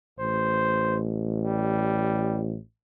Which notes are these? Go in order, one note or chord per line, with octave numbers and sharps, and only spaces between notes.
A1 C5
G3